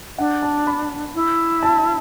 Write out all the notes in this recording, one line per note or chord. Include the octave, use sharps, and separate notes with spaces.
D4 F#5
A5
B5
E4
A5